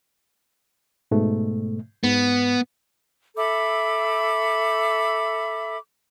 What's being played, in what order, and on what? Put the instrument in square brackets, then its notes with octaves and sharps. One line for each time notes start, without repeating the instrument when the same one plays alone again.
[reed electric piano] G#2 B2 A3
[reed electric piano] G#2 [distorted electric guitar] B3
[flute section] A4 E5 B5 D6